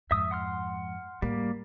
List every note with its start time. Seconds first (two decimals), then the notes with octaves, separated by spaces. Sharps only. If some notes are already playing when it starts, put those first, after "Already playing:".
0.11 F2 G#2 E5 D#6 E6
0.31 F#5 C6 F6
1.22 A2 G3 A#3